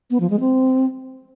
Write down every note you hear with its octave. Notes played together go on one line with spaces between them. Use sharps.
B3
F3
G#3
C4